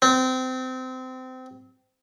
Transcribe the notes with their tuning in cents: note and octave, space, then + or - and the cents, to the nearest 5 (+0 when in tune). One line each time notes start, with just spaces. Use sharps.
C4 -25